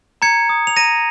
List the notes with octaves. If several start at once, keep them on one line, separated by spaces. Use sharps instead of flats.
A#5 G#6 C#7
D#6
F7
A#5 A#6 D#7